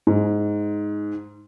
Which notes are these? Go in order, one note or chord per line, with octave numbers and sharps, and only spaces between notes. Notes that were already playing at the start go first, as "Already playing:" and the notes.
G#2